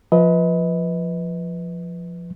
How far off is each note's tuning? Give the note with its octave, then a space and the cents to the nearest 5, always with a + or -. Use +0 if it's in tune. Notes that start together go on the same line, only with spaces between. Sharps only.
F3 +0 B4 +0 D#5 +35